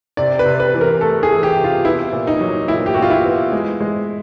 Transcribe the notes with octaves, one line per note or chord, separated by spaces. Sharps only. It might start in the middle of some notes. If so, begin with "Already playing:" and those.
C3 D5
B4
C3
B4
E3
A#4
A3 A4
G#4
E3
G4
C3
F4
B3 E4
A#2
D#4
F#3
A#2 E4
G4
A#2 F#4
F4
E4
B3
G#3
G#3